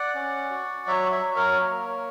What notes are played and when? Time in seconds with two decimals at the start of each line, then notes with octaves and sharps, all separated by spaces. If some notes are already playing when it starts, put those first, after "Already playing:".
Already playing: D5 F#5
0.14 C#4
0.50 F#4
0.87 F#3 C#5 E5
1.12 C#5 E5
1.24 F#3
1.36 A#4 C#5
1.60 A#3